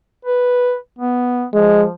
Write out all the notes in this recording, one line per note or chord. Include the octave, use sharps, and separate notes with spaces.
B4
B3
F3 G#3